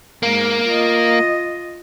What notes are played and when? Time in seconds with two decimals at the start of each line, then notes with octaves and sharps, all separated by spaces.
0.23 G#2 A#3
0.67 F4 D#5